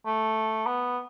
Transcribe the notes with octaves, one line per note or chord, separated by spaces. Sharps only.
A3
B3